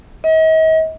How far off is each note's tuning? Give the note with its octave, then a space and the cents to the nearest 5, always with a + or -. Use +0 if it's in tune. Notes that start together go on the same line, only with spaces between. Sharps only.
D#5 +40